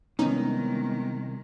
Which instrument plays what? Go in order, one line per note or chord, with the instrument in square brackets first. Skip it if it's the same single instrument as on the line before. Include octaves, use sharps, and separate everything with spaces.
[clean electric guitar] C2 [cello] D#3 G#3 [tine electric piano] B3 [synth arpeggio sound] C#4 D#4